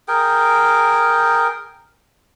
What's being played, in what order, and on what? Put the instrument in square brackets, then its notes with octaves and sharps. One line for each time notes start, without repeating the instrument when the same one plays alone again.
[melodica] G#4 A#4 G5